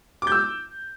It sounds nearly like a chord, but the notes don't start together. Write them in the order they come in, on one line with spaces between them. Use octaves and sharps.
D6 G6 E6